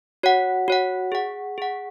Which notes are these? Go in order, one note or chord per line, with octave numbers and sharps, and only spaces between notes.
F#4 C#5 F#5
F#4 C#5 F#5
G#4 F#5
G#4 F#5